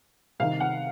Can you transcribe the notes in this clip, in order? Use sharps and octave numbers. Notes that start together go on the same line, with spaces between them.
C2 C3 D#3 F5
F#5